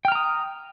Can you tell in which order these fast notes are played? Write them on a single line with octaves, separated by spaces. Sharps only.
G5 F6 A#5 D#6